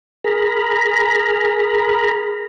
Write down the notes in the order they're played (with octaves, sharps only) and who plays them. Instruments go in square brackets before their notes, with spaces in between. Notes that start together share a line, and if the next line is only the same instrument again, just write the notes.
[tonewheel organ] G#4 A#4 A#5 B5